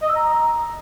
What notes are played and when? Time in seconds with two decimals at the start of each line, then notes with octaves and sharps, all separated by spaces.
0.02 D#5
0.09 E6
0.16 A#5